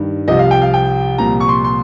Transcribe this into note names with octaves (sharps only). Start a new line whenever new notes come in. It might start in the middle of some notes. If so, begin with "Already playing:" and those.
Already playing: G2 D#3
C2 C3 F3 D#5
F5
G5
F5
G5
C2 A#2 F3 A#5
C#6
C6
C6